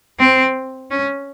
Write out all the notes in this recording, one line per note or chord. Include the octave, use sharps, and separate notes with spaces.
C4
C#4